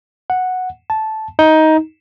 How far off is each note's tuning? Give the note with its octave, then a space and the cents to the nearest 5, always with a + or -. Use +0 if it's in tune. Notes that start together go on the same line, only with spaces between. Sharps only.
F#5 -5
A5 -10
D#4 +15